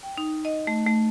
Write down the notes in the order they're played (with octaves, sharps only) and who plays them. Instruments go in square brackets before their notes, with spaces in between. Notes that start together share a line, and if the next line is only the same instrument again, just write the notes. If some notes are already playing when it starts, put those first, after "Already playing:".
[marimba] G5
D#4
D#5
A3
A3